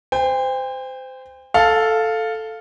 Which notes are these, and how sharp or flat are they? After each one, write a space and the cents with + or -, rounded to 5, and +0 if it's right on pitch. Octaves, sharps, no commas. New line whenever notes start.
C5 -25 G5 +35
A4 +0 F5 +0